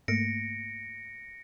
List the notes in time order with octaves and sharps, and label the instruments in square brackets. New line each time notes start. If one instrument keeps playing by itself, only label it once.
[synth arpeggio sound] G#2 A3 A#3 [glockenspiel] A#6 C#7 D7